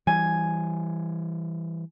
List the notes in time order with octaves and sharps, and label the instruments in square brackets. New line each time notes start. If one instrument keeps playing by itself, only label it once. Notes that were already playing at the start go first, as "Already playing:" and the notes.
[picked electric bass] E3 G3 [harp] G#5